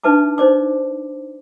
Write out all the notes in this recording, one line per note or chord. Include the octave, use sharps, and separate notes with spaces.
D4 D#4 B4 E5 A5 D6
D#4 C5 D5 D6